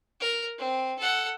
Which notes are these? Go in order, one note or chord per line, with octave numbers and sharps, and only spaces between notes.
A#4
C4
A4 F#5